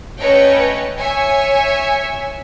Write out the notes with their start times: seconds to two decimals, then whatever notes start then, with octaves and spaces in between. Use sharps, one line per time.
0.18 A3 C#4 B4 C#5 D#5 G5
0.97 C#5 E5 G#5